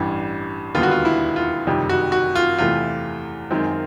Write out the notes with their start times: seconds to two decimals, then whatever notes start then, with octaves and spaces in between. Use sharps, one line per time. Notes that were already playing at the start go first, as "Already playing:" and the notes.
Already playing: A1 G2 E3 G3
0.75 E1 D#2 D3 G3 B3 F4
0.83 F#4
0.91 F4
1.05 E4
1.36 F4
1.66 F#1 F2 C3 D#3 G3
1.89 F#4
2.12 F#4
2.35 F4
2.58 E2 C3 E3 A3 F4
3.51 F#2 D#3 G#3 C4